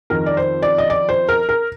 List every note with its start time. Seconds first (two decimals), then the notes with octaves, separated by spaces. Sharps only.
0.10 F2 D#3 A#4
0.26 D5
0.37 C5
0.62 D5
0.78 D#5
0.90 D5
1.09 C5
1.28 A#4
1.49 A#4